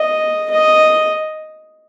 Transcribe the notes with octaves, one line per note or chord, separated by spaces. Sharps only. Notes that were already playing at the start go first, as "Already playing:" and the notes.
Already playing: D#5
D#5